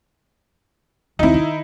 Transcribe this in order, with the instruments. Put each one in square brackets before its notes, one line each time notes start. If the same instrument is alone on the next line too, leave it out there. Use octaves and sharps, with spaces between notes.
[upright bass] D#2 C4 [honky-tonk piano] D#4 E4
[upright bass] D#3